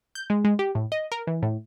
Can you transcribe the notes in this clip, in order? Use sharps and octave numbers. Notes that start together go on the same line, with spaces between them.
G6
G#3
G#3
G4
A2
D#5
A#4
E3
A2